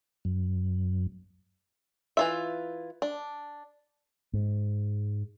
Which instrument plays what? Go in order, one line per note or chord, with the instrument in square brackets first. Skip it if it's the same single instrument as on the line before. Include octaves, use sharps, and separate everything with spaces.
[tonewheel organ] F#2
[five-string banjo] E3 F4 E5
D4
[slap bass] G#2